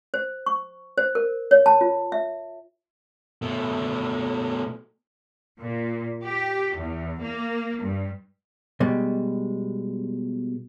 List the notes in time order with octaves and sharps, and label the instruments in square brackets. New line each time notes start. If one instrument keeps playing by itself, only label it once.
[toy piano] C5
C#6
C5
A#4
C#5
A5
F4
E5
[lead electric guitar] B2 A3
[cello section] A#2
G4
E2
A#3
G2
[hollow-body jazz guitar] B2 G3 G#3